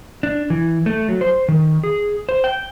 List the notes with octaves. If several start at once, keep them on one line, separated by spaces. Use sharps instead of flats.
D4
E3
A3
F#3
C5
D#3
G#4
C5
G5